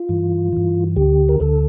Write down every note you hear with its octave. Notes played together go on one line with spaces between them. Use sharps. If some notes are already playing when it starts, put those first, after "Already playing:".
Already playing: F4
G2 E3
G2 E3
D2 D3 G4
A#4
D2 D3 A4